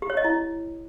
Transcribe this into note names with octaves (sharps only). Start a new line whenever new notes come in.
G4
C#5
D#5
E4